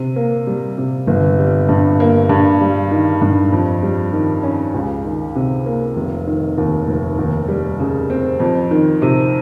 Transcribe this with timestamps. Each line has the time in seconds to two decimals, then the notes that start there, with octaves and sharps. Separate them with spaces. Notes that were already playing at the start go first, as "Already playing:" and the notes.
Already playing: C3
0.16 A#3
0.47 G3
0.78 C3
1.07 G1
1.39 G3
1.69 G2
2.00 A#3
2.29 G2
2.61 G3
2.91 D#3
3.22 G2
3.52 F2
3.83 G3
4.13 D#3
4.43 C#4
4.74 C#2
5.04 D#3
5.35 C3
5.66 A#3
5.96 F1
6.27 D#3
6.58 D#2
6.88 F1
7.18 D#2
7.48 G3
7.79 C#3
8.10 C4
8.40 F2
8.71 D#3
9.02 C3